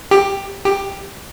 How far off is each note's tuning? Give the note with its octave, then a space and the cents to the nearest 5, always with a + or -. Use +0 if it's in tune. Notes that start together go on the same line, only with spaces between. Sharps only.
G4 +10
G4 +10